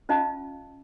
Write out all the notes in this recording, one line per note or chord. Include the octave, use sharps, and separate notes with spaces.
C#4 F4 D#5 F5 G5 A5